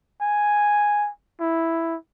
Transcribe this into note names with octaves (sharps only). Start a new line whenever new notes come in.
G#5
E4